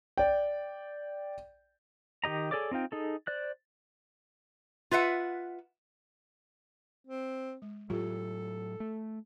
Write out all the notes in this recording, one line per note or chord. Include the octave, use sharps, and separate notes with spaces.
D5 G5
D#3 G4 D#5 A#5
G#4 A4 C#5 D5 D6
C4 D#4 F4 G5
D#4 G#4 A4
C5 D5 F#6
F4 B4 E5 F#5
C4
G#3
A2 F#3 F4 G4 A4
A3